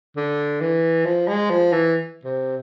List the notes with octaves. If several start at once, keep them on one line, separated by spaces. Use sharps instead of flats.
D3
E3
F3
G#3
F3
E3
C3